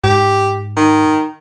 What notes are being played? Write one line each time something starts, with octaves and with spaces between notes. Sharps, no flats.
G#2 G4
D#3